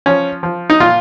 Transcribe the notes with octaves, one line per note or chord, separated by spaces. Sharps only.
F3 C#4
F3
D#4
A#2 F4